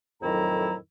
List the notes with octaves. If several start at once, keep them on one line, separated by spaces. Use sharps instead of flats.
F2 A2 D#3 F#3 E4 A#5